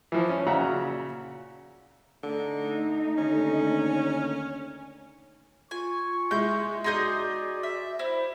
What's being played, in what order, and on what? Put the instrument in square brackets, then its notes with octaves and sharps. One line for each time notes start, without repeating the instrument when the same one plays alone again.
[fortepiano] E3 F3
C#4
A#2 C#3 F#4 E5 F#5 A#5
[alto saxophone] D3 [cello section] A3 D#4
[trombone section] D#2 D3 [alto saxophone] C#4
[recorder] F4 [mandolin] G#5 [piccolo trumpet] C#6
[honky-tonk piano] G#3 E4 [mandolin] G6
[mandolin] D#4 G#4 D#6 [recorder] F#4 [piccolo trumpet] D5 [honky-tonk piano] C6 G6
[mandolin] E5
[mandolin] E4 [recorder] C5